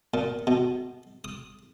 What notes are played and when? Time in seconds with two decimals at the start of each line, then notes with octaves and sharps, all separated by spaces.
0.14 A#2
0.47 B2
1.24 D#6